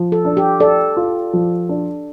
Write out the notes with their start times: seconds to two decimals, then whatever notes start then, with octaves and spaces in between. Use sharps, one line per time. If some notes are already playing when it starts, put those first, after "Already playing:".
Already playing: F3
0.12 A4
0.25 D4
0.37 G4
0.60 A4 D5
0.97 F4
1.33 F3
1.69 D4